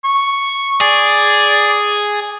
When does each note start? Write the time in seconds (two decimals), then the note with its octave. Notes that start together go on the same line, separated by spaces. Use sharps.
0.05 C#6
0.81 G#4 D5